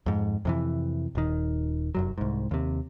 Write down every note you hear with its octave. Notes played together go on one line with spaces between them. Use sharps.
F2 G#2
F2 C3 E3
D#1 D#3
F1 F#2 F#3
C2 G#2
D#2 C3